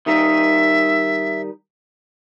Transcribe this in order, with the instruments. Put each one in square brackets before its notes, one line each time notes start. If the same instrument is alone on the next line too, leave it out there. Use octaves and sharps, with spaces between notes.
[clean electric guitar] D#3 G3 D#4 [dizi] E5